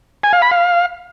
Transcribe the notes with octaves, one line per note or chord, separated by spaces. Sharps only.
G#5
F5
B5
F5